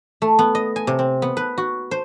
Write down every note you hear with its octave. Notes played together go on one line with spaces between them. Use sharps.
A3
B3
D#5
G#5
C3
C4
B3
B4
F#4
C5